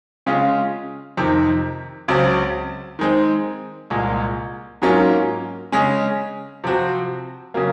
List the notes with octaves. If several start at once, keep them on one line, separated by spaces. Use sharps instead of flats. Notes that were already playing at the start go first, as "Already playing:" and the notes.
C#3 G#3 C#4 F4 G#4
F2 C3 D#3
C#2 C#3 F#3 C4
D#3 G#3 C4
C2 A#2 G#3
G#2 F#3 A#3 C#4 F4
C#3 G#3 C#4
C3 F3 C4 F#4
C#3 F#3 A#3